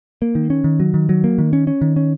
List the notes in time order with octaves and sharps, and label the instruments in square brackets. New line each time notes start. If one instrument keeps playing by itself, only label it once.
[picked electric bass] A#3
D#3
C#4
D#3
F#3
D#3
F#3
A#3
D#3
C#4
C#4
D#3
C#4